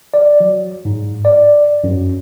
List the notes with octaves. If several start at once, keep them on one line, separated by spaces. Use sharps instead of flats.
D5
F#3
G#2
D5
F#2